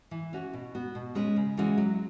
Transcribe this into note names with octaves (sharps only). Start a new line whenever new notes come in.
E3
C#4 F#4 C#5
B2
B3 F#4
B2
G#3 C#4 G#4 B4
C#3
E3 G#3 C#4 F#4
F#3